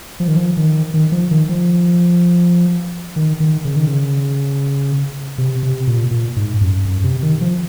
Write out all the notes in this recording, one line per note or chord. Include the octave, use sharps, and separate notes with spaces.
F3
D#3
F3
D#3
D#3
F3
D#3
F3
D#3
D#3
C#3
D#3
C#3
C3
C3
A#2
A#2
G#2
F#2
F#2
C3
D#3
F3